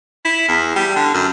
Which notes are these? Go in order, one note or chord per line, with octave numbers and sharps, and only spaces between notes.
E4
E2
G3
D3
F#2